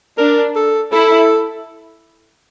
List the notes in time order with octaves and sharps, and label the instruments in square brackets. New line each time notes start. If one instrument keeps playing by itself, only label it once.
[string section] D4 [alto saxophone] A#4
[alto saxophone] A4
[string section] E4 [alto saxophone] A4